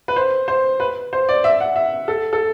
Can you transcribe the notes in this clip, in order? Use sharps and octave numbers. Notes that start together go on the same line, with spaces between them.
B4
C5
C5
B4
C5
D5
E5
F#5
E5
A4
A4